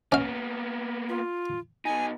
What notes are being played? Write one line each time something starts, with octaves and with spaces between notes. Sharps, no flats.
A#3 B3 C#4 F5
F4
B2 D#4 G#5